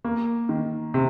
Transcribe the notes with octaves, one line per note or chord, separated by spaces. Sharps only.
A#3
D#3
C3